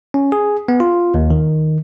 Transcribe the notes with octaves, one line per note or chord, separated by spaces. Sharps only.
C#4
G#4
B3
F4
D#2
D#3